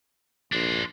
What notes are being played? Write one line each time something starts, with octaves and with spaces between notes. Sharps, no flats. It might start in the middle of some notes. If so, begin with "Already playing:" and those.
A#1 D4 C5